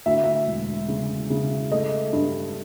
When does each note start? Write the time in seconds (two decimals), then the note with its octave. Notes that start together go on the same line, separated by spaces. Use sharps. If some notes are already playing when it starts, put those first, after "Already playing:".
0.06 D2 E5
0.24 E5
0.47 E1
0.88 C#3
1.30 C#3
1.72 A3 D#5
2.13 G2